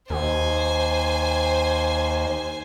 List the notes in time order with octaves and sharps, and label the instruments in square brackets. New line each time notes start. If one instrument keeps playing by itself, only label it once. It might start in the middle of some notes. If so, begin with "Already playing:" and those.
[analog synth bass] D#2 [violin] C5 G#5